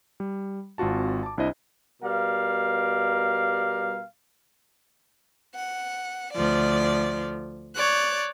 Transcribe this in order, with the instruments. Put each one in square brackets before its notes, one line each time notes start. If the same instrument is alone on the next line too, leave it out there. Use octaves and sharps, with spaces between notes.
[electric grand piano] G3
G#1 C4 F4 F#4 A5
A5 D6
C2 D4 E4 C5 D#5
[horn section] B2 G3 A#4 F5
[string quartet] F#5
D2 F3 D5
C#5 D5 F#6